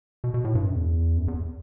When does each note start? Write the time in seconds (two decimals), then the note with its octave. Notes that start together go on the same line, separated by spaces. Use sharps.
0.24 B2
0.34 B2
0.44 A2
0.55 G2
0.65 F#2
0.76 E2
1.17 F#2
1.28 E2